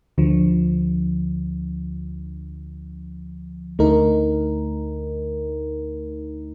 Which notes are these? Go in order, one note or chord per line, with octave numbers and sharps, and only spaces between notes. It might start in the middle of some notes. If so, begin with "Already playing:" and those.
D2 D3 F3
D2 D3 A3 D#4 A#4